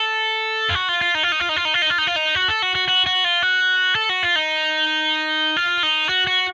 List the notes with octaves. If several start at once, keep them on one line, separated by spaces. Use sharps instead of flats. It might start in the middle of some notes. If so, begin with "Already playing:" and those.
Already playing: A4
F4
F#4
F4
F4
D#4
F4
D#4
F4
D#4
F4
D#4
F4
D#4
F4
D#4
F4
D#4
F#4
A4
F#4
F#4
F#4
F#4
F4
F#4
A4
F#4
F4
D#4
F4
D#4
F#4
F#4